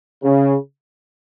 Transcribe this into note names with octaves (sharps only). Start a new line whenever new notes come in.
C#3